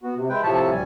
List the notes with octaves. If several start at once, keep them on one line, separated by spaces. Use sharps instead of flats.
B3 F#4
C3
G#3 E4 B4 G5
A2 C3 F3 C#5 E5 A5
D2 G3 G#5